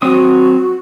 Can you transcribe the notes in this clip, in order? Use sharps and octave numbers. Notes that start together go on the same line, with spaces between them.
F#3 C4 F#4 D#6